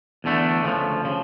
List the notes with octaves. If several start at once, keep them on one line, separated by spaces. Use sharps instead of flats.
E2 D3 A3 D4
D2 C#3 F3
C#3 F3